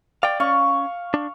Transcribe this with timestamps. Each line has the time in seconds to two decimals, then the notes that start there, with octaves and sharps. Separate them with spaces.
0.23 D5 F5 G5
0.40 C#4 F5 C#6
1.14 D4